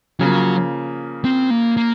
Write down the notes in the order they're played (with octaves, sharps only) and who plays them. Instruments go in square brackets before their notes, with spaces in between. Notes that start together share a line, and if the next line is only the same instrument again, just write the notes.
[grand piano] C#3 F3 A#3 [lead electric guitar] F#3
[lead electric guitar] C4
A#3
A#3